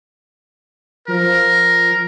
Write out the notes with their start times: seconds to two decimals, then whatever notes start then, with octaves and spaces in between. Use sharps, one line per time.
1.08 F3 A#4